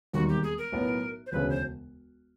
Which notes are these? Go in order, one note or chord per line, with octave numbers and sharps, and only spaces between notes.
E1 D#2 D#3 G3 A#3 F#4
G4
G#4
A#4
B1 A2 F#3 B3
C5
E1 D2 C#3 B4
C5